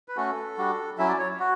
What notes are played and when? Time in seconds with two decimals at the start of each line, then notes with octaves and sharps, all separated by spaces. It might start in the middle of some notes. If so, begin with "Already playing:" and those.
0.08 B4
0.16 A3 C#4 F#4 A4
0.57 G3 D4 F#4
0.98 F#3 C#4 E4 E5
1.09 D5
1.19 C#5
1.40 F#4